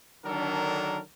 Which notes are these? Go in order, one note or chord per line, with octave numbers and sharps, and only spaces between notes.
D3 D#3 F#3 D4 A4 A#4